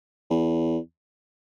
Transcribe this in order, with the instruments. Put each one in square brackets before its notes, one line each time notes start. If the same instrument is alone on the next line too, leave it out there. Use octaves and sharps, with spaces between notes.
[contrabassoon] E2